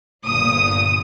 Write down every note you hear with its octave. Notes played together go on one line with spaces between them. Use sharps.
G1 A#2 D#6